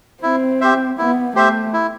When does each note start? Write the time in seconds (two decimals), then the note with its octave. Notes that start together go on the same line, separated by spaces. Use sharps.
0.23 C4 E4
0.61 G4 C5 E5
0.98 B3 E4
1.35 A3 G4 C5 E5
1.74 E4